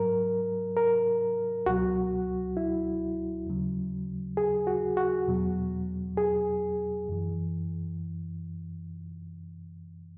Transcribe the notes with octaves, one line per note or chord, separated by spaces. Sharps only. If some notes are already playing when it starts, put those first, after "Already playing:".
Already playing: G#2 F#3 A#4
A#4
C#2 B2 F#3 F#4
E4
D#2 C#3 F#3
G#4
F#4
F#4
E2 B2 F#3
G#4
F#2 E3